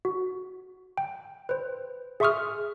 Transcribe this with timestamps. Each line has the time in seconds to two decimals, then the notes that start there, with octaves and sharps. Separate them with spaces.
0.05 F#4
0.97 G5
1.49 B4 C5
2.20 G#4 E5 C6 C#6 D#6 F6